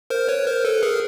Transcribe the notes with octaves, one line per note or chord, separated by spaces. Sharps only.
A#4 C5
B4 C#5
A#4 C5
A4 B4
G#4 A#4